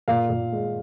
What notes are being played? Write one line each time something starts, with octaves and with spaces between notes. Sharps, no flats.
A#2 F5
A#2
G#3